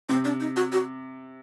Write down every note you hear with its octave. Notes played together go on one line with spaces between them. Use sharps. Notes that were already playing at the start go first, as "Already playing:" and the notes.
C3 C4
D4
D#4
F#4
F#4